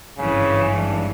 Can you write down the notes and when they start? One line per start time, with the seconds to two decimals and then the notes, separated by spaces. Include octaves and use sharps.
0.18 G#1 G2 C#3 E3
0.78 D4